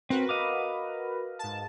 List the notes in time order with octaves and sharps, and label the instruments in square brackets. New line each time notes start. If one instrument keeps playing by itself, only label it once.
[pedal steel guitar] C4 [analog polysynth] F#4 A#4 B4
[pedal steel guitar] D#5 F5 D6
[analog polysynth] G#2 A5